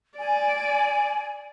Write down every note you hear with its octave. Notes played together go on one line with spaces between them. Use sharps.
D5 G#5